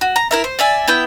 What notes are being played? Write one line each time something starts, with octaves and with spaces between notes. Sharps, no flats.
F#4
A#5
E4 A#4 E5
C5
D5 E5 G#5
B3 E4 G5